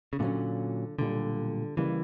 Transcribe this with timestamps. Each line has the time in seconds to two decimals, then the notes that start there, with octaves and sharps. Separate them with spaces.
0.13 C#3
0.19 A#2 D3 F#3 C#4
0.99 B1 A#2 D3 G3
1.77 C#2 C#3 E3 G3 A#3